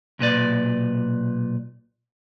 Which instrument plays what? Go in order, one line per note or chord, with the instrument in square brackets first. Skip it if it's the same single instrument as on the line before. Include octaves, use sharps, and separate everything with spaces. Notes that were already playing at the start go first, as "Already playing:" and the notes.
[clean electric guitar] B1 A#2 B4 D5